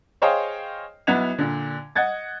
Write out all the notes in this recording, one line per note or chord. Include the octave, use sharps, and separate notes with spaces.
G#4 C5 C#5 D#5 F5 G5
B1 B3 E4 F#5 G#6 F7
A#2 D3
D#5 F#5 G#6 A6